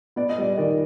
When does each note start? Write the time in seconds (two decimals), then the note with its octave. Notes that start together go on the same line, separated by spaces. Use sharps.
0.16 B3 D5
0.29 D#5
0.38 G3 D5
0.58 D#3 D5